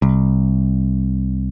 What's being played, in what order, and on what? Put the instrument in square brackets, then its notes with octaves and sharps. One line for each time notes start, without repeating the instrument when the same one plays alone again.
[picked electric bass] C2